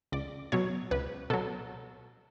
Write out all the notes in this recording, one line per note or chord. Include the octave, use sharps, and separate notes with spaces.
C#2 D5
B2 F#3 C#5
C#2 B4
B2 F#3 A4